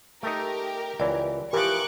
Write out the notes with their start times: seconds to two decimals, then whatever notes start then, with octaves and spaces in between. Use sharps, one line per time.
0.23 A3 D#4 G4 A#4
1.00 C#2 E3 D5
1.53 E3 F3 G4 A#4 C#6 D6 F#6